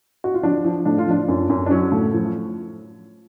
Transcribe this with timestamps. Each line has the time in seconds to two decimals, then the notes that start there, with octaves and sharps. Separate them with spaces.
0.24 F#4
0.34 F4
0.43 F3 D4
0.64 F3
0.85 A2 D4
0.98 F4
1.07 F3 D4
1.28 F#2
1.49 F#2
1.66 D4
1.71 F#3 C#4
1.92 A2
2.13 F3